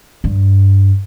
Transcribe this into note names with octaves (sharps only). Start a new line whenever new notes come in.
G2